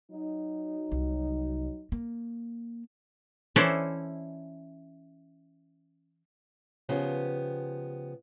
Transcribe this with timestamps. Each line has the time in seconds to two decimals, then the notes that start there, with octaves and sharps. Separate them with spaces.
0.11 F#3 D#4
0.92 C2
1.92 A#3
3.56 E3 C#4 E4 A4 C5 D5
6.89 C#3 F3 B3 G4